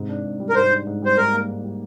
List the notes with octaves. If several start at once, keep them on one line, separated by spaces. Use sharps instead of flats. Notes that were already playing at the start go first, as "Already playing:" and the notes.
Already playing: G#2 C3
D4
G#2
G3
A#4
G#2 C5
D4
G#2
G3 C5
G#2 A#4
A#3
G#2
G3